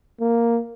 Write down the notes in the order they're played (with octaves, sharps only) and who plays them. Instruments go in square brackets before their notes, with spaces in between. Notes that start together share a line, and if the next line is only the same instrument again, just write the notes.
[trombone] A#3